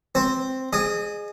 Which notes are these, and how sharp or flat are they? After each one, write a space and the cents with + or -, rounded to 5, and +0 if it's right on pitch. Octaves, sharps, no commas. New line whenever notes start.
C4 +0 C5 +0
G#4 +0 D#5 -35